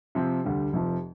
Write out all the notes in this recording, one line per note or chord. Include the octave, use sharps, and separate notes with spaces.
C3 F3 C4
D2 D3 G3
F1 F2 C3 F3